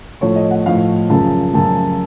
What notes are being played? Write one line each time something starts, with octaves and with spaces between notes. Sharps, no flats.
A2 F3 A3 C#5
D#5
F#5
A2 F3 A3 F5
F#2 C#3 F3 A5
F#2 C#3 F3 A5